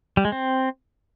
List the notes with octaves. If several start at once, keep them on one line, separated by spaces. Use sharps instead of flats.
G3
G#3
C4